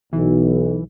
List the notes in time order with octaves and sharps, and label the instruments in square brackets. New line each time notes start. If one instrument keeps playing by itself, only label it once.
[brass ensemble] B1 [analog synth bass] E3